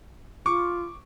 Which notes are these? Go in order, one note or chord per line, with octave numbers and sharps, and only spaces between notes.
F4 C#6 D6